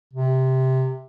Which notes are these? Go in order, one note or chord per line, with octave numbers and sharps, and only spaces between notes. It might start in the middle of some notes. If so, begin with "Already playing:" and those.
C3